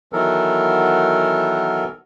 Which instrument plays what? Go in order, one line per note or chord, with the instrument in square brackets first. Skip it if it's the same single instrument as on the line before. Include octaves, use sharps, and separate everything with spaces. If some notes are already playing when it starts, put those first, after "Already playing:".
[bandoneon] D#3 E3 F#3 B3 A4 A#4